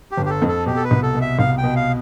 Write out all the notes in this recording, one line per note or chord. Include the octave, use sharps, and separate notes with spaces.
G4
G1
G4
A4
F2
A4
B2 G4
A4
B4
C2
A4
B2
E5
C2 F5
G5
B2
F5